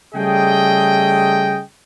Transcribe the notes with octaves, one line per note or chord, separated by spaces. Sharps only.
C#3 G3 A3 G#4 D#5 G5